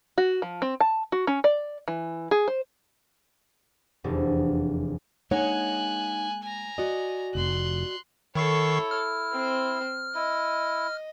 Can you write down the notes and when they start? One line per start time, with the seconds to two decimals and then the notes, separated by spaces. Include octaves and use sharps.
0.18 F#4
0.42 F3
0.62 C4
0.80 A5
1.12 F#4
1.27 C#4
1.44 D5
1.88 E3
2.31 G#4
2.48 C5
4.04 F1 E2 D4
5.31 G#3 A#3 D4 D#4 C#5 F#5 G#5 F#6
6.43 G#5 A#5
6.78 F#4 D5 D#5
7.35 F1 C6 F#6
8.35 D#3 E4 A4 C#5 C#6 C7
8.91 F6
9.32 C4 C5
10.15 E4 D#5